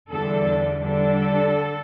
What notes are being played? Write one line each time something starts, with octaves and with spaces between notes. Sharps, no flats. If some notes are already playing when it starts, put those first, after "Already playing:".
E2 D3 G3 D4 A4
D3 G3 D4 A4